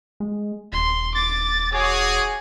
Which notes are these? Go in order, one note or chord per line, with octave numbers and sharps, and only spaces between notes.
G#3
D#1 C6
D6 A6
F#4 G#4 C#5 D6